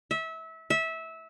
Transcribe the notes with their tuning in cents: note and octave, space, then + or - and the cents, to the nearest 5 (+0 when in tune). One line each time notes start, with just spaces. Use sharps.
E5 -25
E5 -20